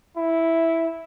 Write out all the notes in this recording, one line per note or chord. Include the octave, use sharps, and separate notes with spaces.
E4